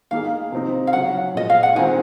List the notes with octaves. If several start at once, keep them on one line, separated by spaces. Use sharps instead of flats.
D#3 A#3 D#4 G#4 F5
C3 F3 C4 D#4
F5
C#3 F#3 C#4 F#5
A#2 F3 G#3 D#5
F5
F#5
D#3 G#3 C4 D#4 G#5